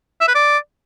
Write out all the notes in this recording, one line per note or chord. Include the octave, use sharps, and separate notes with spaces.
E5
B4
D5